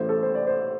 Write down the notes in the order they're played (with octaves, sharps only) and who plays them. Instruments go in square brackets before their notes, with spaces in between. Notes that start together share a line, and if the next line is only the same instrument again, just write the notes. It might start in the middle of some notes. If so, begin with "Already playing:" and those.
Already playing: [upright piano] A1 A2 C5
A4
C5
D5
C5